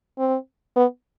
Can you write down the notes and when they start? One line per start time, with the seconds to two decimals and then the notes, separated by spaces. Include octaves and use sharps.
0.18 C4
0.76 B3